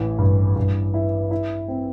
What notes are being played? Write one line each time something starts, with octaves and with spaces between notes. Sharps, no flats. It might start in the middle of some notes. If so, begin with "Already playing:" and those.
Already playing: A1 E3
G2
G2
E4
E4
C4